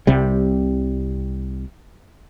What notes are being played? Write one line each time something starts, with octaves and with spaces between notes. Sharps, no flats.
C2 C3 G3